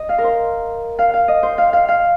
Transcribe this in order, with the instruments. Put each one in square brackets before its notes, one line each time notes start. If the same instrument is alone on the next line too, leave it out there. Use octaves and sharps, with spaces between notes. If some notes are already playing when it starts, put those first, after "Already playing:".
Already playing: [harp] D#5
F5
A#4
C5
F5
F5
D#5
C5
F5
F5
F5